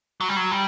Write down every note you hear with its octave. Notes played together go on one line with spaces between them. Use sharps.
F#3
G3
F#3
G3